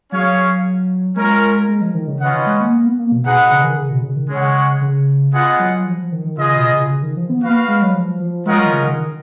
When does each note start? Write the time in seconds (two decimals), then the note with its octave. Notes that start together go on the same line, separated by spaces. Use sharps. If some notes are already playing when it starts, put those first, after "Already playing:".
0.12 F#3 C#4 G#4 C#5 F5
1.16 G#3 C#4 F4 A#4
1.68 G#3
1.81 F3
1.94 D#3
2.07 C#3
2.20 C#3 C#4 F4 B4 D#5 F#5
2.33 D#3
2.46 G#3
2.60 A#3
2.72 A#3
2.86 B3
2.99 A#3
3.12 B2
3.25 B2 D#4 G#4 B4 F#5
3.51 C#3
3.64 D#3
3.77 C#3
3.90 B2
4.03 C#3
4.16 D#3
4.29 C#3 G#3 C#4 G#4 C#5 F#5
4.81 C#3
5.33 B3 F4 G#4 D#5 F#5
5.59 F#3
5.86 F3
5.99 F3
6.12 D#3
6.24 D#3
6.37 C#3 B3 F4 G#4 D#5
6.56 B2
6.73 C#3
6.90 C#3
7.03 D#3
7.17 F3
7.29 B3
7.42 A#3 F#4 B4 F5
7.68 G#3
7.82 F#3
7.94 F3
8.20 F3
8.46 G#3 C#4 F4 A#4 D#5 F#5
8.59 F#3
8.66 D#3
8.73 C#3
8.86 D#3
8.99 D#3